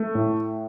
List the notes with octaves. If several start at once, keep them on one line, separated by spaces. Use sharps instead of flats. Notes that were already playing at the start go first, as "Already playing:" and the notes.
Already playing: A3
A2